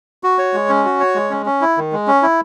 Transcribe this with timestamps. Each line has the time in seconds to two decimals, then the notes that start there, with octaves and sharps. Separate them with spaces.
0.24 F#4
0.39 C#5
0.54 G#3
0.69 C#4
0.85 F#4
1.00 C#5
1.15 G#3
1.31 C#4
1.46 C#4
1.61 E4
1.77 D#3
1.93 G#3
2.08 C#4
2.22 E4